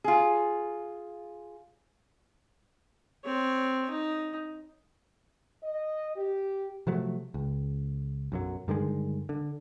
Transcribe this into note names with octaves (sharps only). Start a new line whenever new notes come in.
F4 G#4
C4 C#5
D#4
D#5
G4
C3 F3 F#3 A3
C#2
B1 F#2 F#3
G2 D3 D#3 G#3
D3